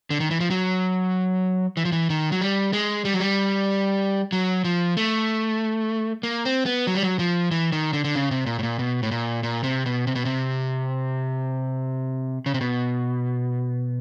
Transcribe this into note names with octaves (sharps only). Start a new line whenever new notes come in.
D3
D#3
E3
F3
F#3
E3
F3
E3
D#3
F#3
G3
G#3
G3
F#3
G3
F#3
F3
A3
A#3
C4
B3
F#3
G3
F#3
F3
E3
D#3
D3
D3
C#3
C3
A#2
A2
A#2
B2
A2
A#2
A#2
C3
B2
C3
B2
C3
C#3
C3
B2